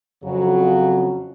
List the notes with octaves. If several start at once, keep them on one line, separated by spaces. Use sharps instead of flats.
F2 C#3 F#3